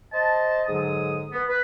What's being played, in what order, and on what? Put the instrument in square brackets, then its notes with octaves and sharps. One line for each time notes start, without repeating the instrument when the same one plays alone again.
[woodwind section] C5 D#5 A5
G#2 D3 F#3 D#6
B3
B4